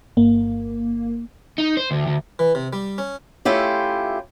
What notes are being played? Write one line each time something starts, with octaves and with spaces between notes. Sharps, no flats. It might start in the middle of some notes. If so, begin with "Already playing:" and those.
G1 A#3
D#4
C5
D2
D2
E3
C3
G3
C#4
A3 C#4 E4 F4 G4